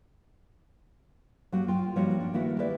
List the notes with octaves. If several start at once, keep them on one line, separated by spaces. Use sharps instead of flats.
F#3 A#3 F#4 G4
F4 G5
F3 G3 A#3 D#4 F#4 C#5
D4
D#3 A#3 E4 F#4 B4
E4 G4 B4 D5